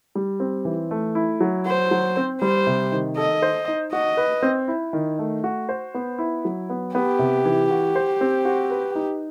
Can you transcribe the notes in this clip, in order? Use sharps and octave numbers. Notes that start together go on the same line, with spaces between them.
G3
C4
E3
A3
E4
F#3
F#4 C5
F#3
C4
G3 C5
C3
D#3
A4 D#5
C5
D#4
F#4 D#5
B4
C4
E4
D#3
A3
F#4
C5
B3
E4
F#3
B3
B3 G4
C3
E3
F#4
C5
C4
F#4
B4
D#4